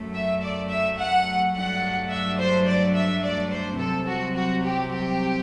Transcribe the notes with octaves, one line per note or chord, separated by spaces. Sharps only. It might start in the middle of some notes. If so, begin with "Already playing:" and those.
Already playing: F#2 F#3 A3
E5
D5
E5
F#5
G2 F#3 A3 D4 F#5
E5
C5
D5
E5
D5
C5
C2 C3 F#3 C4 A4
F#4
F#4
G4
G4